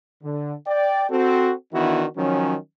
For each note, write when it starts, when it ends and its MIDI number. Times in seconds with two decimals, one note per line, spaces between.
0.23 0.53 50
0.67 1.05 74
0.67 1.05 79
1.10 1.52 60
1.10 1.52 66
1.10 1.52 69
1.73 2.05 51
1.73 2.05 52
1.73 2.05 59
1.73 2.05 62
1.73 2.05 64
1.73 2.05 66
2.17 2.56 51
2.17 2.56 53
2.17 2.56 54
2.17 2.56 61